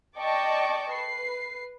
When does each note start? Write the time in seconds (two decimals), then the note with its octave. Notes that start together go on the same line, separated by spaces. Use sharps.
0.17 D5 D#5 G5 A5 C#6 D6
0.91 B4 C7